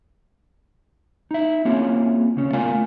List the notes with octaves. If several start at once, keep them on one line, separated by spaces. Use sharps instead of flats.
D#4 E5
A#3 C4 C#4 E4 F4 G#4
D2 C#3 C#4
A3 B3 F4 A#4 F5 G#5